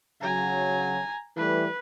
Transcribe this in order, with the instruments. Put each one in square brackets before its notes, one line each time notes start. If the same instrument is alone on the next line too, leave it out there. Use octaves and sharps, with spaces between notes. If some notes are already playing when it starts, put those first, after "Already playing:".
[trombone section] C#3 F#3 [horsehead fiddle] G#5 A#5
[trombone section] E3 G3 A3 [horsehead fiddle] B4